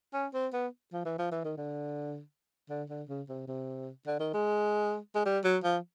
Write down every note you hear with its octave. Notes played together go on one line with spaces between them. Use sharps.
C#4
C4
B3
F3
E3
F3
E3
D#3
D3
D3
D3
C#3
C3
C3
D3
D#3
G#3
G#3
G3
F#3
F3